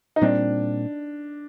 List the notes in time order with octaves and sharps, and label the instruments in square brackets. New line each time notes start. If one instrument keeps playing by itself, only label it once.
[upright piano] D#4
[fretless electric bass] A#2 G3 C4 [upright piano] D4